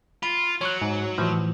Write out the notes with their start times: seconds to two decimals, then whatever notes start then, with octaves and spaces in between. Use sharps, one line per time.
0.23 F4 B5
0.61 F#3 C#5 C#6 F#6
0.82 G#2
1.18 A2 E3 F3